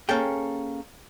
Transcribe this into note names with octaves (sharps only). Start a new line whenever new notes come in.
A#3 C#4 G#4 A4 G5